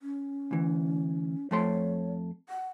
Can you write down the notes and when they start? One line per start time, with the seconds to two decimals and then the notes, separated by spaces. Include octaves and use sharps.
0.01 C#4
0.51 D2 E3
1.51 F2 A3 C#5 C6
2.49 F#5